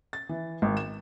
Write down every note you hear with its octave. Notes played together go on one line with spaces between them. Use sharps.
A6
E3
G#1
E7